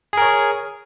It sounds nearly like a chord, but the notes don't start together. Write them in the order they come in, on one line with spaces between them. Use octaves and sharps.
G#4 A#4 C#5